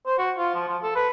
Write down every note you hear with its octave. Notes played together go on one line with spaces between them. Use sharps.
C5
F#4
F4
F3
F3
A4
B4